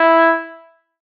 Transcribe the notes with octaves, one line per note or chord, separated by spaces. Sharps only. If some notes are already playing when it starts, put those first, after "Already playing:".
Already playing: E4